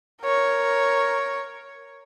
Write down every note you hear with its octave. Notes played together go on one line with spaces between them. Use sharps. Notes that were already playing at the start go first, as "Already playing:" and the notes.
A#4 C#5